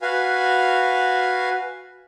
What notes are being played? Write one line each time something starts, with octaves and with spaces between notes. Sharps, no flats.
F#4 B4 F5 G#5